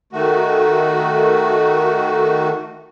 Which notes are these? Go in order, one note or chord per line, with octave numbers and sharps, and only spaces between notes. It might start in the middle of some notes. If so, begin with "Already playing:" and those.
D#3 A3 F#4